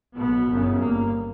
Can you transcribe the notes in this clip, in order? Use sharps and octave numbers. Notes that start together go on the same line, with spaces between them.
B1 B2 B3
G1 F#2 C#3
G1 G2 A#3